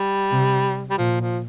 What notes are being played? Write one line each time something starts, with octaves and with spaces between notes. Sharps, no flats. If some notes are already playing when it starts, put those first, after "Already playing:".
Already playing: G3
C3
G3
A#2 F3
F3